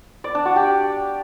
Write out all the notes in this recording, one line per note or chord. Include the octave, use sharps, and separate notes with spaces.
D5
D4
F#4
G4